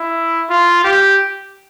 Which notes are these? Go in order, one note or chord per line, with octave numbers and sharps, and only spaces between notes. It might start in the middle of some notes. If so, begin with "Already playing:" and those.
Already playing: E4
F4
G4